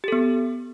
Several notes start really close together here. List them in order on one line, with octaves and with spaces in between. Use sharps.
G4 A4 B3